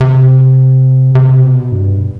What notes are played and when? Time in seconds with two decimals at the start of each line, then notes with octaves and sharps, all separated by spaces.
0.01 C3
1.15 C3
1.43 B2
1.72 G2